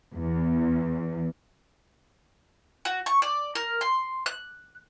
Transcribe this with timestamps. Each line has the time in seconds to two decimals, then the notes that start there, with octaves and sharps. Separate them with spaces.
0.15 E2
2.85 F#4
3.06 C#6
3.22 D5
3.55 A#4
3.81 C6
4.26 F#6